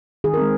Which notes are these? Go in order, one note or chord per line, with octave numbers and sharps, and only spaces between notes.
D#3 G#4
A#4
G#3 C4